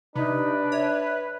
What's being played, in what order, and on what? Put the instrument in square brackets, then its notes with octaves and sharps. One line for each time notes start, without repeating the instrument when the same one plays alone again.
[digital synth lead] C3 [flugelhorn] D4 [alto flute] D#4 [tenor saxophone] B4
[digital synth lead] C#5 [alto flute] E5